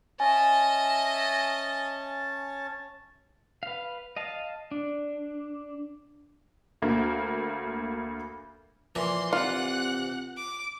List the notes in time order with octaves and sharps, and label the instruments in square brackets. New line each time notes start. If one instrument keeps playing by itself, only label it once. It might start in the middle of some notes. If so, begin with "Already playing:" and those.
[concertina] C#4 A5 [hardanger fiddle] D#5 E5 [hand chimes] G#5
[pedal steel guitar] B4 F5
D#5 F5 A5
D4
[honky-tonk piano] D2 A#3
[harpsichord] A#2 E3 [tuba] F3 [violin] C6
[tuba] C3 [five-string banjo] F4 [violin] F#5 F#6
[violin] D6